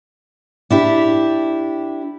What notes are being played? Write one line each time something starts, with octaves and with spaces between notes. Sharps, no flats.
D4 E4 G4